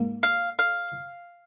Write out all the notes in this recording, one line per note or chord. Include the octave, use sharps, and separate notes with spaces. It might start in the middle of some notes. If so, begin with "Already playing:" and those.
Already playing: G#2 A#3
F5
F5